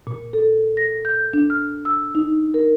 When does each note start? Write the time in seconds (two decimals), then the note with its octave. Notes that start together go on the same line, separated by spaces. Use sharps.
0.07 A#2
0.33 A4
0.77 A#6
1.05 G6
1.33 D4
1.50 F6
1.85 E6
2.15 D#4
2.54 A#4